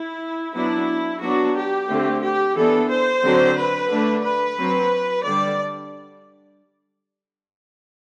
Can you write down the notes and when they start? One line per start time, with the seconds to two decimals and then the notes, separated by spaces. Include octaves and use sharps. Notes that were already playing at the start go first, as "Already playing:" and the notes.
Already playing: E4
0.56 F#3 B3 D4 E4
1.22 F#3 B3 D4 F#4
1.57 G4
1.90 D3 A3 C4
2.23 G4
2.57 E3 B3 D4 A4
2.90 C5
3.23 D3 F#3 C4
3.58 B4
3.91 D3 A3 D4
4.24 B4
4.58 F#3 C4
5.25 D3 G3 D4 D5